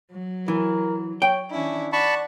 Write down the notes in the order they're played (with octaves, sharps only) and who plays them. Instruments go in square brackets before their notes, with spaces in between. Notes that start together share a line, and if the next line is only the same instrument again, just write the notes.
[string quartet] F#3
[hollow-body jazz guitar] E3 [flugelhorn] A#4
[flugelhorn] C#5 [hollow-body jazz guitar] G5
[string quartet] D#3 C#4 E4 [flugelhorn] D4
[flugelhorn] D5 [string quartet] F#5 [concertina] A5 B5 C#6